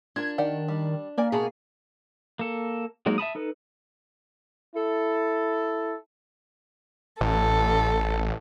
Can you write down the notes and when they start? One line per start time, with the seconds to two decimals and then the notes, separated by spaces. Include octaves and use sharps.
0.16 D4 F4 A#4 G#6
0.38 D#3 G4 D5 F#5
0.68 G3
1.18 A#3 A#4 D5 G#5
1.32 B2 F#4 G#4 A5 B5
2.39 A#3 A4
3.06 F#3 G#3 A#3 D#4 A#4
3.18 E5 A5 B5 D#6
3.35 D#4 A4 B4
4.75 E4 A4
7.21 A1 A4